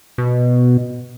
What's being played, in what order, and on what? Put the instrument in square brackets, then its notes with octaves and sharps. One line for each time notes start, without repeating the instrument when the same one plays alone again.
[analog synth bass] B2